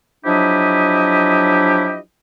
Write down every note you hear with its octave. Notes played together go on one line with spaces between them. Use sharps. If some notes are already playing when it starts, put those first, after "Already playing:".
F3 F#3 D4 E4 G4 D#5